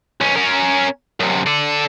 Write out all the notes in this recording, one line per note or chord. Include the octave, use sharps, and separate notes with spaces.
B1 C#4
C#4 A#4
F#2 C3
A4 D5